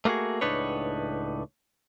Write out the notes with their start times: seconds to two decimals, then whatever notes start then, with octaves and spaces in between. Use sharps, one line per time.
0.05 A3 A#3 F4 F#4 G#4
0.41 C#2 A2 D4 D#4 B4 C#5